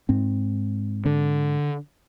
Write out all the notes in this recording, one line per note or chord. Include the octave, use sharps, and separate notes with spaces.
G#2 C4
D3